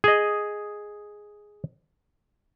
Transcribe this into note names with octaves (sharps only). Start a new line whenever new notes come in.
G#4 D#5